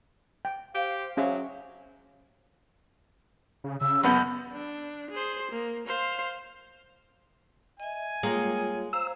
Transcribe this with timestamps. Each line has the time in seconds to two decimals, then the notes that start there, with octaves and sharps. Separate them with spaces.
0.45 G5
0.75 G4 C5 F5
1.17 F#3 C#4 G#4 E5
3.64 C#3
3.81 C#3 E6
4.03 F#1 B3 B5 G6
4.52 D4
5.11 G#4 C5
5.51 A#3
5.87 C5 F5
7.80 D#5 E5 G#5
8.23 G3 G#3 A#3 F4 C#5
8.93 C5 F5 A#5 E6